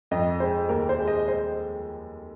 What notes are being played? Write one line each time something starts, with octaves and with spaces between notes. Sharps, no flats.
F2 D#5
G#3 C5
D#2 A#4
C5
G#3
D#5
C5